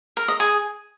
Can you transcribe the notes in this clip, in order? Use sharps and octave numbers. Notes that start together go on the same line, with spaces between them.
A#4
D#5
G#4